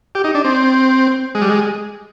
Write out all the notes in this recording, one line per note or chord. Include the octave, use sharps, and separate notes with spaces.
G4
D#4
D4
C4
G#3
G3
G#3